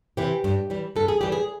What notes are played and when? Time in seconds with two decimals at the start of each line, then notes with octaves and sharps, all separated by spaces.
0.17 C3 E3 G4
0.44 G2
0.70 E3 G3
0.96 G2 A4
1.08 G#4
1.21 E3 G3 G4
1.32 G#4